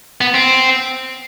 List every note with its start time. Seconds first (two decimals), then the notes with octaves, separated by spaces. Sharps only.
0.21 B3
0.35 C4